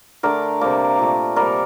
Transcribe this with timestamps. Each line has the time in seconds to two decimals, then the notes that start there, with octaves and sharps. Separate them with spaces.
0.23 D3 A3 A#4 D5
0.61 C3 G3 A#3 A#4 D5
0.99 A#2 A3
1.36 C3 G3 A#3 A#4 D5